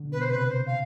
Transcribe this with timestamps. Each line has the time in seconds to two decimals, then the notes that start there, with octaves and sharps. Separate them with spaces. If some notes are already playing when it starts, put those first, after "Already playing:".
Already playing: D3
0.12 B2 B4
0.21 C5
0.30 C3 B4
0.48 C5
0.66 F5